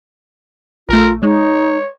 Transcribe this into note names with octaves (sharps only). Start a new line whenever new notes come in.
A#1 A3 F4 A#4
G#3 D#4 C#5